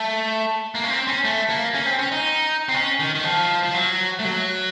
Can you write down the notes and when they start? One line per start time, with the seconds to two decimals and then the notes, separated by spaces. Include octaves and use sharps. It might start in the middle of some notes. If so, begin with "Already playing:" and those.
Already playing: A3
0.75 A#3
0.84 C#4
0.91 C4
1.07 C#4
1.24 A3
1.50 A#3
1.75 C#4
1.86 C4
1.99 C#4
2.12 D#4
2.69 C4
2.74 C#4
3.00 D#3
3.15 D#3
3.24 F3
3.63 F3
3.74 F#3
4.19 A3
4.24 F#3